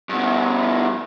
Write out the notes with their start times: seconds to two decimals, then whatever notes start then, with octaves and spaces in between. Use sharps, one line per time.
0.09 G2 B2